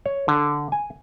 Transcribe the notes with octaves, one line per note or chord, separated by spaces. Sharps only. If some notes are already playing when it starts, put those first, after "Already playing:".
C#5
D3
G#5